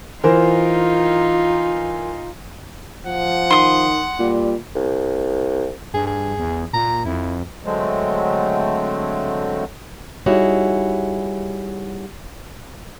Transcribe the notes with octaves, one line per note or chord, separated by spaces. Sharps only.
E3 D#4 F4 A#4 C5
F3 F#5
D#3 C6 D#6
A#2 G3
C2
G2 G#4
G#4
E2
A#2 A#5
F2 E4
D3 F#3 G#3 A3 C4
G3 D#4 E4 F#4 G#4 C#5